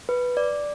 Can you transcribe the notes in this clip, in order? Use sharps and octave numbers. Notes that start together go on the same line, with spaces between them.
B4
D5